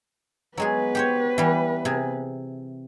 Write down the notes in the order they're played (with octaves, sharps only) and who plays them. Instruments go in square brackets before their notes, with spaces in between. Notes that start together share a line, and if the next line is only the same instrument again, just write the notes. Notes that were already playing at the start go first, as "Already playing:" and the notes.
[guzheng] F#3 G#3 G#4 [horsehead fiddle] B3 B4
[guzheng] G4 C5 C#5
E3 G3
C3 G#4